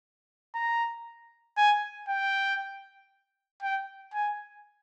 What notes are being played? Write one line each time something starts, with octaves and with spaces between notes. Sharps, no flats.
A#5
G#5
G5
G5
G#5